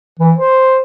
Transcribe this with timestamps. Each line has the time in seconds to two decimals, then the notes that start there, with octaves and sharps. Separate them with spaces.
0.20 E3
0.36 C5